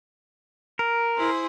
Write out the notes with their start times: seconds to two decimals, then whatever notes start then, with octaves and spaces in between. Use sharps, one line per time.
0.79 A#4
1.17 E4 G#4 C5